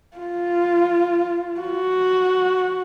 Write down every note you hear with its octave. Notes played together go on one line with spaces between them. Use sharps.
F4
F#4